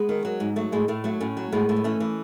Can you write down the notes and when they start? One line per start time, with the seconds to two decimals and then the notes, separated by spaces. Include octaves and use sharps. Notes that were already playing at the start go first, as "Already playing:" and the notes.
Already playing: G#3 B3
0.09 D#3
0.25 F#3
0.40 G#2
0.56 F#3 A3
0.72 A2 G#3
0.88 A2 A3
1.04 F#3 A3
1.20 A2 A3 C#4
1.37 F#3
1.52 A2 G#3 B3
1.69 A2
1.76 B3
1.84 E3 A3 C#4
2.00 E3